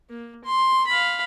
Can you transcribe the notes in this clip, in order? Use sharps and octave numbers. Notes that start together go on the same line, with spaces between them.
A#3
C6
F5 B5